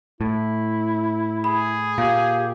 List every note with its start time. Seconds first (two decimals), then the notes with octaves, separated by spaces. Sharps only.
0.21 A2 E4
1.44 G#4 B5
1.98 A#2 G4 F5